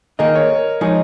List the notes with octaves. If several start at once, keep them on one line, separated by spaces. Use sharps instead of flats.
D#3 A#3 D#4 G#4 A#4 D#5
C#5
A#4
F3 G#3 D#4 G#4 C#5